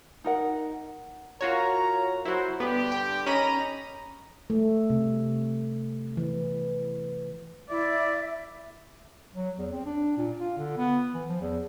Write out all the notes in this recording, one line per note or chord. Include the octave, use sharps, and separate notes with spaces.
D#4 A#4 F#5
F4 F#4 A#4 C#5 A#5
F#3 E4 F#4 C5
G2 D3 B3 G4 B4
G5
D#3 C#4 D#5 A#5 B5 D#7
A3
C3
E3
E4 D5 E5
F#3
E2
C4
D4
A#2
F4
D3
B3
E3
F3
E2